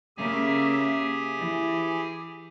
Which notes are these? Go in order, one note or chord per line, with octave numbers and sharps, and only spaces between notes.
C#3 A#3 G4 G#4 E5 G#5
E3